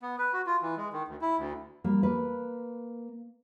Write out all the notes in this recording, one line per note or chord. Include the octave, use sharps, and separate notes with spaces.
B3
B4
F#4
F4
E3
G#3
D#3
D2
E4
D2
G3 A#3
A#3 B4